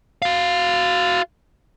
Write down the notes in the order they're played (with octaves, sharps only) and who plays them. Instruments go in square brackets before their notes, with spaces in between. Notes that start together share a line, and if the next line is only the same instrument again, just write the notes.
[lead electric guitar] F#4 F5